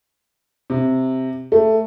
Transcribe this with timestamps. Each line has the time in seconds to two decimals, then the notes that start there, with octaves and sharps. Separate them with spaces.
0.70 C3
1.52 A3